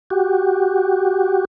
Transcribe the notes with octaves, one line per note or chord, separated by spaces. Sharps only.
F#4 G4